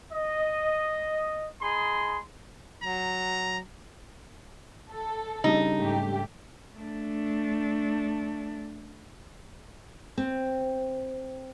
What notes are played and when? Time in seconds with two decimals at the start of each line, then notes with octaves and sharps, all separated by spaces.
0.13 D#5
1.62 D#4 G#4 B5 C6
2.83 F#3 A#5
4.91 A4
5.44 C#3 G3 D4 D#4
5.79 G#2 A3 G4
6.78 A3 D4
10.18 C4